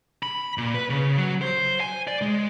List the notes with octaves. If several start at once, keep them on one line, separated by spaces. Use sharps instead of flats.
B5
A#2
B4
C#3
F#3
C5
G#5
D5
G#3